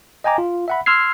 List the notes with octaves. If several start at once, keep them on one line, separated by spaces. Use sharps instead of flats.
D#5 G5 G#5 A#5 D6
F4
E5 F#5 B5
C6 E6 F6 G#6 C7